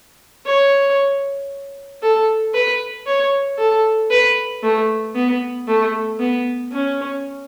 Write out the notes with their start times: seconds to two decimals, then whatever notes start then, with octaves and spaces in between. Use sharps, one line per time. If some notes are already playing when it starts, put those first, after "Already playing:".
0.45 C#5
2.02 A4
2.54 B4
3.06 C#5
3.58 A4
4.10 B4
4.63 A3
5.15 B3
5.67 A3
6.19 B3
6.72 C#4